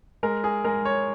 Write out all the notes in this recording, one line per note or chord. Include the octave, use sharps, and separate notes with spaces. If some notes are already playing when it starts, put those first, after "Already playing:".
G#3 A#4
G#4
G#3 A#4
C#5